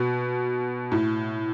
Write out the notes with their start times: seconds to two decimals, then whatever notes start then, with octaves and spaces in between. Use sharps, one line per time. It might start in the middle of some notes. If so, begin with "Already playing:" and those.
Already playing: B2
0.92 A2